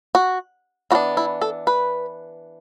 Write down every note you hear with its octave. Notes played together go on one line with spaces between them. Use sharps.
F#4
E3 B3 D4 F#4
E4
A4
B4